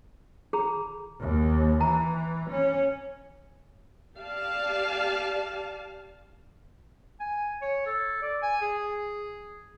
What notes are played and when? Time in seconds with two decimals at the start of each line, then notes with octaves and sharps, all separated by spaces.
0.53 G#4 A#5 B5
1.20 D#2
1.80 E3 A#5
2.50 C#4
4.15 G4 D5 F5 A5
7.20 G#5
7.62 C#5
7.86 A4
8.22 D5
8.42 G#5
8.61 G#4